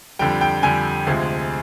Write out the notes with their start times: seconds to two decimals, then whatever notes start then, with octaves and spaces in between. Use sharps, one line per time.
0.19 F2 D3 G3 G5
0.41 G5
0.63 F2 D3 G3 G#5
1.07 D2 C3 F3 G#3